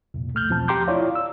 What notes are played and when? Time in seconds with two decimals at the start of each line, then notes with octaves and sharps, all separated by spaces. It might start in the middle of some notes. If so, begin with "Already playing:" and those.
0.14 C2 F2 A#2
0.34 C2 A3 F6 G6
0.48 E2 B2 F3 C4 A5
0.68 G4 G5 A#5 C6 D6 G6
0.88 E4 F4 C#5 D5 F5
1.15 E6